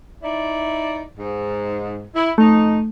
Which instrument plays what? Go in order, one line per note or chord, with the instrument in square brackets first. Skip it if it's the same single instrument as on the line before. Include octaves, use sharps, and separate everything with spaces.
[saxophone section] D#4 E4 D5
G#2
E4
[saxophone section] F2 D#4 [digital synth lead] A3